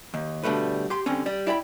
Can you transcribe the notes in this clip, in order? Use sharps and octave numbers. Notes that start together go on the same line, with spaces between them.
D#2
B2 D3 G3 A3 B4
G4 C6
D3 G3 C4 C#4
G3 D5
E4 D5 G5 B5